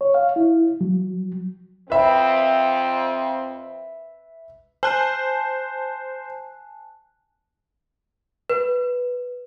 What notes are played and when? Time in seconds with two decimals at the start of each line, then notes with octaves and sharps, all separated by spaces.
0.01 C#5
0.14 F5
0.36 E4
0.81 F#3
1.90 F2 C4 B4 E5 B5
4.83 C5 G#5 A5 F#6
8.50 B4